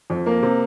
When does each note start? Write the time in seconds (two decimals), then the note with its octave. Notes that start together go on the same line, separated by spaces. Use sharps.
0.10 F2
0.26 A#3 A#4
0.43 C3